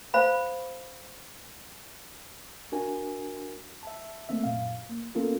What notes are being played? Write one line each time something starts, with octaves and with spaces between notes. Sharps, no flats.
C5 F5 B5
D4 F#4 A#4 G#5
E5 A5
A3 A#3 C4 E5
F#2 A#2 F5
A#3
A#3 B3 C#4 F4 A4 A#4